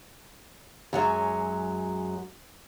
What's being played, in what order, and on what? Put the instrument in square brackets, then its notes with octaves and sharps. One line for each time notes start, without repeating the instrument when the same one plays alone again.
[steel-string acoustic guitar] F#2 F#3 G#3